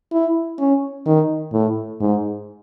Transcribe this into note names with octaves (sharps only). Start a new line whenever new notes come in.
E4
C#4
D#3
A2
G#2